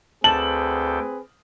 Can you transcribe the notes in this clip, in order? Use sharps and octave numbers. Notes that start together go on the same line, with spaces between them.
D2 C4 G#4 A4 B4 G5 A5 F#7